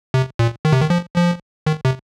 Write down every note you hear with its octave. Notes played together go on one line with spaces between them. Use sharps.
C3
A#2
D#3
C3
D#3
F3
F3
D#3
C3